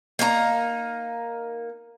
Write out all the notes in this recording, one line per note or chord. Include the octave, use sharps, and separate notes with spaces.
A#3 D#4 F#4 A#5